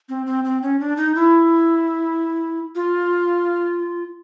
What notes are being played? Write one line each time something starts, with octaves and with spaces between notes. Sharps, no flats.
C4
C4
C4
C#4
D4
D#4
E4
F4